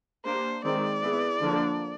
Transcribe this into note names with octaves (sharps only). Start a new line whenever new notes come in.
A#3 D4 G4 C5
D#3 G#3 C4 D5
B3 E4 G#4
D3 F3 A#3 D4